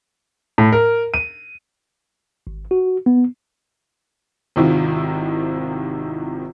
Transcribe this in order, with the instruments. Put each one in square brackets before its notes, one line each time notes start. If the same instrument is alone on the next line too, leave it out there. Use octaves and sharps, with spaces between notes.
[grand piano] A2
A#4
D#7
[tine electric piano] G#1
F#4
B3
[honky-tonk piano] G#1 C3 D#3 E4 F4